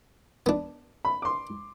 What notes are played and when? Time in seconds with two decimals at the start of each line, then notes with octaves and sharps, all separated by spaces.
0.46 B3 D4
1.05 B5
1.22 C6 D6